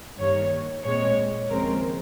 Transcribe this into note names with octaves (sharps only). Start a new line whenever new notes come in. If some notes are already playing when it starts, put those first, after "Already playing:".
G2 D#3 G3 A#3 C#5
A#2 G#3 C4 C#5
D#2 C#3 F3 G#3 C4 A#4